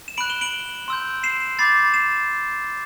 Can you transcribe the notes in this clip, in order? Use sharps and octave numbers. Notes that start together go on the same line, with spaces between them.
E7
B5 F#6 D7 F#7
E7 G7
D7 F#7
C6 E6 G6
C7 E7
B5 D6 G6 A6 C7
C7 E7